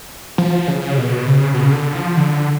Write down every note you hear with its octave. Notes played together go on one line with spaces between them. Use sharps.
F3
C#3
B2
C#3
B2
C#3
D3
F3
D3